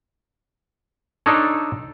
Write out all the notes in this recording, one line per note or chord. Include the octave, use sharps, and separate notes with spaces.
D4 D#4 A4 C#5